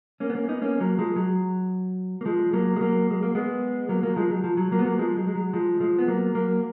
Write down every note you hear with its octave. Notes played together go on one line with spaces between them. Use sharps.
A#3 C#4
B3
A#3 C#4
B3 D#4
A#3 C#4
F#3 A#3
F3 G#3
F#3
A#3
F3 G#3
F#3 A#3
G#3
F#3 A#3
G#3
A#3
G#3 B3
F#3 A#3
F#3 A#3
F3 G#3
F#3
F3
F#3
F#3 A#3
B3
F#3 A#3
F3 G#3
F#3
G#3
F#3
F3 G#3
F3 G#3
B3
F#3 A#3
F#3 A#3